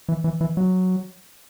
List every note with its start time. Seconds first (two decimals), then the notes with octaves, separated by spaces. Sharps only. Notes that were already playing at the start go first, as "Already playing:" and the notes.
0.09 E3
0.24 E3
0.41 E3
0.57 F#3